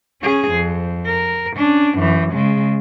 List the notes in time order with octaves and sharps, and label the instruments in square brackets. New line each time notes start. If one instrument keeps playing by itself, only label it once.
[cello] C#4 G#4
F2
A#4
C#4 D4
F#2 E3
C#3 G#3